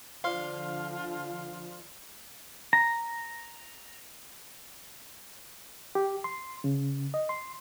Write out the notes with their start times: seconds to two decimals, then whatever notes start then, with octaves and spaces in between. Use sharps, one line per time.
0.24 D3 F3 F4 C5 D5 F5 C6 F6
2.73 A#5
5.95 G4
6.24 C6
6.64 C#3
7.14 D#5
7.29 C6